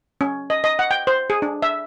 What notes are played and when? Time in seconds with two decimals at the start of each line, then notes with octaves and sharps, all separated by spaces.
0.21 C#4
0.50 D#5
0.64 D#5
0.79 F#5
0.91 G5
1.07 C5
1.30 G#4
1.42 D4
1.62 E5